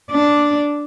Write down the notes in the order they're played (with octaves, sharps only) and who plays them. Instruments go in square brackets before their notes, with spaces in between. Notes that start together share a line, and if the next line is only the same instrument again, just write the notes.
[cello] D4 D5